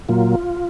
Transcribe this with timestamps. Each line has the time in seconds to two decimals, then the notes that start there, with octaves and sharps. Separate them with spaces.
0.09 A#2 F#3 A#3 F4